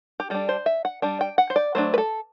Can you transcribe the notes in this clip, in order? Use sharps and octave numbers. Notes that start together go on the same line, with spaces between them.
G4
G3 D4 A4
C5
E5
F#5
G3 D4
G5
F#5
C5
D5
F#3 A3 D4 C5
B4
A4